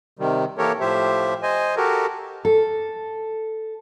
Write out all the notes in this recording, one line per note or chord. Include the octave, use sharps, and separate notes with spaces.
C3 D#3 G3
E3 A#3 G4 A4 A#4 C#5
A2 F3 G4 C5 E5
C5 D#5 G#5
F#4 G4 A4 A#4
A4